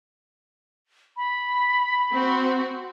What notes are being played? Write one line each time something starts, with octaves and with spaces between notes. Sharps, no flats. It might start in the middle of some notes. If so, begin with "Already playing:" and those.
B5
C4 F#4